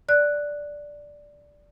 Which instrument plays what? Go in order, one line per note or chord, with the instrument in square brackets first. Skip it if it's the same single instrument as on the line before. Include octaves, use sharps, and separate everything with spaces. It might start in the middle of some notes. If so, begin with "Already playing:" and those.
[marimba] D5 F#6